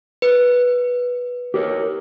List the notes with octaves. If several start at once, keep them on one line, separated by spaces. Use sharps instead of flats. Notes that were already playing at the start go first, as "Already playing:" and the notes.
B4
G4 A#4 C#5